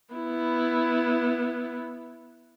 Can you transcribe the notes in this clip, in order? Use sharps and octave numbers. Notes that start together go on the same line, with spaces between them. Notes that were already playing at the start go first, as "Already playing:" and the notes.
B3 E4